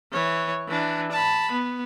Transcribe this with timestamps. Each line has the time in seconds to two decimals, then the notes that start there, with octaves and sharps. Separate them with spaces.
0.12 E3 C#5
0.68 E3 D4
1.12 A5 B5
1.52 B3